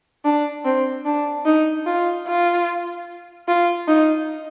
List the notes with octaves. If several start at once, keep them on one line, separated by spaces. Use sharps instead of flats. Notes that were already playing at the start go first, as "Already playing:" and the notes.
D4
C4
D4
D#4
F4
F4
F4
D#4